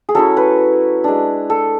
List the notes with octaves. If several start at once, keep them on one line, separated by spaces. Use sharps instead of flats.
G#4
F#3 C#4 E4 A4
B4
G#3 D4
A4